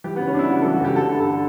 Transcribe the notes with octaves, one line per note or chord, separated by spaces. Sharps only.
E3 G4
B3
C#3
C#4
C#3 D4 E4
C#3 F#4
A4
E3
F#4
C#2 G4
D3 A4
G2
A4
D3